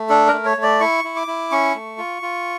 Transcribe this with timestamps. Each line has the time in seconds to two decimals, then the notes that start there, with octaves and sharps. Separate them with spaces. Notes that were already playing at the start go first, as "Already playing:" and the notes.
Already playing: A3
0.09 D4 A4
0.28 A3 A#4
0.45 C#5
0.57 A3
0.63 D5
0.80 E4 C#6
1.04 E4
1.16 D6
1.27 E4
1.51 C#4 C#6
1.75 A3
1.98 F4
2.22 F4